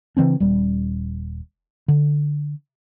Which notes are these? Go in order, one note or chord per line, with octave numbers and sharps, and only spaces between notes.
C#3 E3 C4 D4
D#1 G3
D3